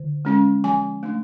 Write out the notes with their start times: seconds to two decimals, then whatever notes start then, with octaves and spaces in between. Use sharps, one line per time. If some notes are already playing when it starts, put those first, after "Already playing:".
Already playing: D3
0.25 G#3 C#4
0.64 F3 G#5
1.03 A3 D4